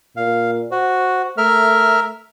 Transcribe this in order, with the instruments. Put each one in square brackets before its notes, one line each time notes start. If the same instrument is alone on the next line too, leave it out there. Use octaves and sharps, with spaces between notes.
[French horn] A#2 [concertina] F5
[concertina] F#4 [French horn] C5
[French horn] A3 [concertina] A#4 E5 F6